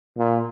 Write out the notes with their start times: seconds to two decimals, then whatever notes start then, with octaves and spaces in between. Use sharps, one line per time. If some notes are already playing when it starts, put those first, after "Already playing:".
0.18 A#2